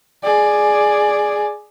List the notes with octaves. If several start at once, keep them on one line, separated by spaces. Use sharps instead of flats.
G#4 D5